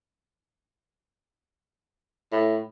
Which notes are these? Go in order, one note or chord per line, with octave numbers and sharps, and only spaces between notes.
A2